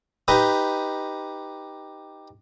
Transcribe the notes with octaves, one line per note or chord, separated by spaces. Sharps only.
D#4 G4 B4 D#5